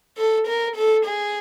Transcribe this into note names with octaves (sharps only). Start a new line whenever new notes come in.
A4
A#4
A4
G#4